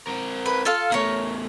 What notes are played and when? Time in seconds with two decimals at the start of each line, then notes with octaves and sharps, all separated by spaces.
0.07 C4 A#4
0.46 B4
0.65 F4 A4 F5
0.92 E2 A3 A#4 C#5